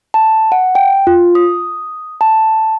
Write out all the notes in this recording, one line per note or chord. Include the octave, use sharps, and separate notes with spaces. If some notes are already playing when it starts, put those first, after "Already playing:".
A5
F#5
G5
F4
D#6
A5